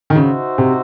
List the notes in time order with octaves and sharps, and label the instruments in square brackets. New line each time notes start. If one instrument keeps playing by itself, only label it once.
[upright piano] D#3
[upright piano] C#3 [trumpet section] D#4 F#4 C5 E5
[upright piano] C3